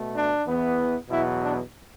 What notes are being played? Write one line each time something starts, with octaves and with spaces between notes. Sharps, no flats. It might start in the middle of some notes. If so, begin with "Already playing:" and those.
Already playing: B2 A3
D4
E2 E3 B3
E2 B2 F#3 B3 E4
D4